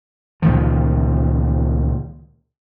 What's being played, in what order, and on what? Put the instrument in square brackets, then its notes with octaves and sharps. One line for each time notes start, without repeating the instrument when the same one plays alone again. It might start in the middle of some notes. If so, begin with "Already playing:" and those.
[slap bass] C#2 A#2 D#3 F3